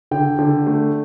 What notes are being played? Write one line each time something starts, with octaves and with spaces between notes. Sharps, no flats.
D3 G5
D3
A3